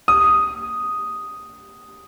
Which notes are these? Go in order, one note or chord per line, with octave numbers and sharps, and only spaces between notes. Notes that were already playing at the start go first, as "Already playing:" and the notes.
D#6